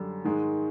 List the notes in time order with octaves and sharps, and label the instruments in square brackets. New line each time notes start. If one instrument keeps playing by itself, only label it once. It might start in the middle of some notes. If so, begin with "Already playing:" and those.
Already playing: [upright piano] F#2 D3 G3
G#2 D#3 G#3